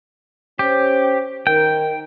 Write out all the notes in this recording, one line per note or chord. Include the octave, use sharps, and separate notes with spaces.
C#4 G4 C5
D#3 A#4 G5